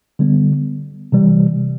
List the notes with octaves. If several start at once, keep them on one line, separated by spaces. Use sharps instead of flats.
D3 G3 B3
C3 E3 G3